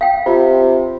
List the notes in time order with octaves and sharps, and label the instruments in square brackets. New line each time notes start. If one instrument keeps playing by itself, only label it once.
[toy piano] F5 G5
[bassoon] C3 [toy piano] F4